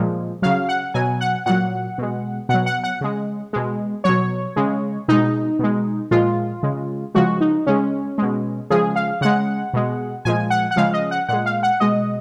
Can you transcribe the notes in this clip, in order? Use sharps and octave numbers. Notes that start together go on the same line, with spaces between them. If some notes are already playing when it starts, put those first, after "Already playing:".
Already playing: A#2 F3 G#3
C#3 F#3 F5
F#5
B2 F#3 G#5
F#5
A#2 F#3 F#5
B2 G#3
B2 F#3 F#5
F#5
F#5
C#3 G#3
B2 G#3
B2 F#3 C#5
C#3 G#3
B2 G#3 D#4
B2 G#3
A#2 F3 G#3 F4
C#3 G#3
C#3 F3 G#3 F#4
D#4
C#3 G#3 C#4
B2 G#3
C#3 F3 G#3 G#4
F5
C#3 G#3 F#5
B2 G#3
A#2 F3 G#3 G#5
F#5
F#5
C#3 F3 G#3 F5
D#5
F#5
A#2 G#3 F#5
F5
F#5
B2 G#3 D#5